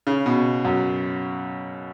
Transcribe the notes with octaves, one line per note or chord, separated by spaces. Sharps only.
C#3
B2
F#2